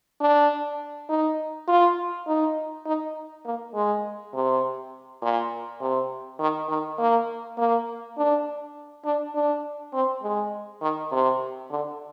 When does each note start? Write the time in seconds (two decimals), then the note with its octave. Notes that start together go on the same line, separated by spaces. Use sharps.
0.21 D4
1.09 D#4
1.68 F4
2.27 D#4
2.86 D#4
3.45 A#3
3.75 G#3
4.34 C3
5.22 A#2
5.81 C3
6.40 D#3
6.69 D#3
6.98 A#3
7.57 A#3
8.17 D4
9.05 D4
9.35 D4
9.94 C4
10.23 G#3
10.82 D#3
11.12 C3
11.70 D3